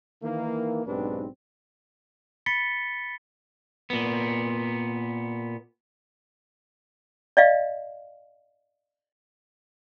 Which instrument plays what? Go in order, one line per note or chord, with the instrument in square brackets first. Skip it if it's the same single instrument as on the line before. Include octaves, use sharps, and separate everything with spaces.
[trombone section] D#3 E3 A#3
B1 G#2 C4 D4 G4 B4
[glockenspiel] B5 A6 B6 C#7 G7
[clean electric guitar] A#2 B3
[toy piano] D5 D#5 F5